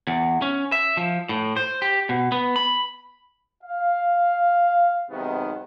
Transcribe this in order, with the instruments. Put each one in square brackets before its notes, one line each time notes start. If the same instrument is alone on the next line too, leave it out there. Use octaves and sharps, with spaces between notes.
[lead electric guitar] E2
C#4
E5
F3
A2
C5
G4
B2
B3
B5
[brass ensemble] F5
B1 G#2 C3 D#3 B3